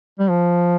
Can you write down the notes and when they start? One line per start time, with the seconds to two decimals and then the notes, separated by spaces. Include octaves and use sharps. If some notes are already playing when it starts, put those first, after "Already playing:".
0.19 G3
0.29 F3